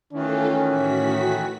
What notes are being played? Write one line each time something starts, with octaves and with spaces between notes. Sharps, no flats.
D#3 E3 A3 C#4 F4 A4
A2 F#4 B6